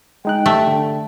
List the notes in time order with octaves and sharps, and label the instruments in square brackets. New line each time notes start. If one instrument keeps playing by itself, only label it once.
[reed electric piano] G#3 D#4 F#6 [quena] G5
[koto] A3 [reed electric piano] G4 E5
[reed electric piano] D3